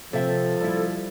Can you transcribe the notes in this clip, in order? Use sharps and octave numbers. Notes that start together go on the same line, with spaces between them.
C3 F3 A4 E5
G3 E4